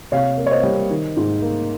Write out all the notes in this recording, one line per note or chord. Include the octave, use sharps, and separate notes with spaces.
C3 C#5 F5
A#3
C#5
C5 D#5
G3
D#3
G#2
A#3